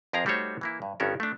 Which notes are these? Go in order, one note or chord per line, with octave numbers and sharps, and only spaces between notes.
F2 F3 G#4 A#4 F5 A#5
G3 A3 D#4 F#4 C5 C#5
E3 A#3 E4
G2
G1 G2 B3 C#4 A4 A#4
A3 D4